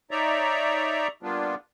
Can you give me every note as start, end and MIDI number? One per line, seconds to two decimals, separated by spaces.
0.11 1.08 63
0.11 1.08 73
0.11 1.08 74
0.11 1.08 76
0.11 1.08 82
1.23 1.55 55
1.23 1.55 58
1.23 1.55 59
1.23 1.55 62
1.23 1.55 65